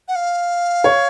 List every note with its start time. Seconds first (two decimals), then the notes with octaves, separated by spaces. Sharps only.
0.08 F#5
0.15 F5
0.84 C#5